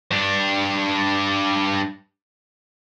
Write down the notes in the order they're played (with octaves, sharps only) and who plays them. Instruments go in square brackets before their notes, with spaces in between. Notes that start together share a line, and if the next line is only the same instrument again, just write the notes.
[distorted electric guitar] G2 D4